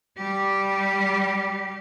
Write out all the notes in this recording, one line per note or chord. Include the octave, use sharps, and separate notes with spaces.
G3 G4